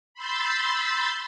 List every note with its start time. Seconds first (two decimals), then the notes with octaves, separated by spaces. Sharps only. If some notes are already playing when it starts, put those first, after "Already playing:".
0.14 B5 C6 E6 G6 A6